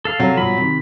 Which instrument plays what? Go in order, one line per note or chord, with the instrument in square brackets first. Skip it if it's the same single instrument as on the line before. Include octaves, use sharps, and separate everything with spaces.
[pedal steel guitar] A4 F5
[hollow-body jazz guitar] C3 [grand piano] F#3
[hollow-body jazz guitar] G2 B2 F3 [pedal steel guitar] B5
[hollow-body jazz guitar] C3 D#3